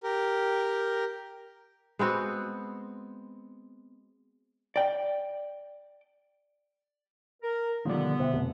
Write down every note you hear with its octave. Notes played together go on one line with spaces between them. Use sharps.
G4 A#4
G#3 B3 C4 F#4
D5 G5
A#4
B2 D3 D#3 F3 G3 B3 F4 D5
B2 C5 E5 G5
F1